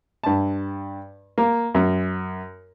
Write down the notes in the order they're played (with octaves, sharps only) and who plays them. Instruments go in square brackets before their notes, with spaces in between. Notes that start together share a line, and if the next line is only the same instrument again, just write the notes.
[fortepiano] G2 A5
A#3
F#2